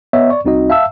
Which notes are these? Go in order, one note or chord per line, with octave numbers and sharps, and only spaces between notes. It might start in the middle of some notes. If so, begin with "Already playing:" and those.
B3 C#5 D#5 E5
D5 C#6
C2 C4 D#4 F#4 D#5
E5 F5 A5 E6